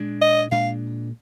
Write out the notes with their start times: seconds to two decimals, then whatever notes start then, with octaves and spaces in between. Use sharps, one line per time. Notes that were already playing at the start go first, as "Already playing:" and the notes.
Already playing: A#2 G#3 D4
0.21 D#5
0.51 A#2 G#3 D4 F5